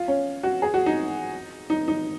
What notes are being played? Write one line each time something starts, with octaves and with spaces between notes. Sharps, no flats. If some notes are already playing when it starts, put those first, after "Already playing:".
Already playing: F4
C#4
F#4
G#4
F#4
D#4
D#4
D#4